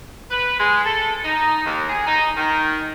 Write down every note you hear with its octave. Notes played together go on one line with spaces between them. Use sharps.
B4
G#3
A4
D#4
D#2
G#4
D#4
D#3